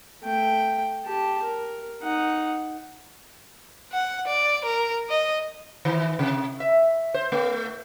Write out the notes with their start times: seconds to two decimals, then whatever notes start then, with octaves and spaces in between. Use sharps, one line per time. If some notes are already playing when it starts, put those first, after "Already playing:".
0.24 A3 G5
1.06 G4 A5
1.43 A#4
2.03 D#4 F#5
3.93 F#5
4.28 D5
4.65 A#4
5.10 D#5
5.85 D#3
6.19 C3
6.60 E5
7.14 C5
7.32 A3